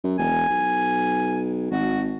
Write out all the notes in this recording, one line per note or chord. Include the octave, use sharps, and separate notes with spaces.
F#2
E1 G#5
B1
G#1 F#4